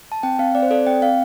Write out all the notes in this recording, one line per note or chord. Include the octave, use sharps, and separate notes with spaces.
A5
C4 G5
C4 F5
C4 D5
C5
A4 D5
C4 G5
C4 F5